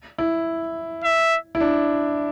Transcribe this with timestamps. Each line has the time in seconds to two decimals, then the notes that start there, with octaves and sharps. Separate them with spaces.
0.18 E4
1.04 E5
1.55 E4
1.60 D4